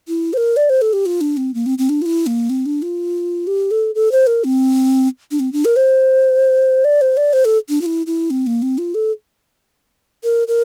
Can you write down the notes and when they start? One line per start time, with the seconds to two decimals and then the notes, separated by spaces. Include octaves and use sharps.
0.08 E4
0.33 C5
0.37 A#4
0.57 D5
0.69 C5
0.82 A4
0.93 G4
1.06 F4
1.21 D4
1.37 C4
1.54 A#3
1.66 C4
1.78 C4
1.89 D4
2.02 F4
2.06 E4
2.27 A#3
2.50 C4
2.66 D4
2.82 F4
3.47 G4
3.71 A4
3.95 A4
4.12 C5
4.27 A#4
4.44 C4
5.31 D4
5.40 C4
5.53 D4
5.65 A#4
5.76 C5
6.85 D5
7.01 C5
7.17 D5
7.33 C5
7.45 A4
7.69 D4
7.81 F4
7.86 E4
8.07 E4
8.30 C4
8.47 A#3
8.62 C4
8.78 F4
8.95 A4
10.24 A#4
10.48 A#4